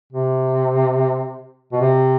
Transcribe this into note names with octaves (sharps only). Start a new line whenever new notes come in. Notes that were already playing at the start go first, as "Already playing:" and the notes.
C3
B2
C3